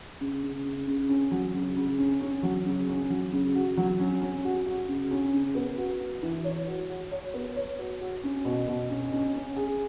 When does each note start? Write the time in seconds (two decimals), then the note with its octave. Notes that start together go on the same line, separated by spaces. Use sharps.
0.21 C#3
0.43 C#3
0.65 C#3
0.87 C#3
1.09 C#4
1.31 F#3
1.54 C#3
1.76 C#3
1.98 C#4
2.21 C#4
2.43 F#3
2.65 C#3
2.88 C#4
3.10 F#3
3.32 C#3
3.55 F#4
3.77 F#3
4.00 C#4
4.22 C#4
4.45 F#4
4.66 F#4
4.88 C#3
5.11 C#4
5.33 C#3
5.55 B3
5.78 F#4
6.00 F#4
6.23 E3
6.44 C#5
6.67 F#4
6.89 F#4
7.11 C#5
7.34 B3
7.56 C#5
7.78 F#4
8.01 F#4
8.24 C#4
8.45 B2
8.68 B2
8.90 C#4
9.12 C#4
9.34 C#4
9.56 G#4